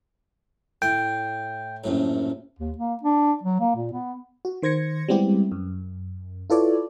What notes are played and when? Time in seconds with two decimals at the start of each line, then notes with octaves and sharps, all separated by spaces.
0.82 A2 G5 C6
1.84 A#1 F#2 A2
2.59 D#2
2.78 A#3
3.03 D4
3.43 F#3
3.60 A#3
3.75 A#2
3.93 B3
4.45 F#4
4.62 D#3 C5 G#6 A#6 C#7
5.08 G3 G#3 B3 C4 E4 G4
5.52 F#2
6.50 E4 F4 A4 B4 C#5 D5